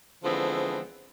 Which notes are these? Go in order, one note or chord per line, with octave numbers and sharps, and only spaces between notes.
D3 E3 F3 G#3 B3 C4